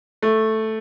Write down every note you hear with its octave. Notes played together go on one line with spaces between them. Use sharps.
A3